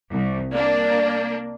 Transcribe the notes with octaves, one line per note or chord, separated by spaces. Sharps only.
C2
A#3 D4 D5